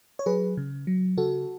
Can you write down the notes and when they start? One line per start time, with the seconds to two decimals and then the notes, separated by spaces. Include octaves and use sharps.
0.19 C#5
0.26 F#3 G#4 B4
0.57 C#3
0.87 F#3
1.18 C#3 F#4 A4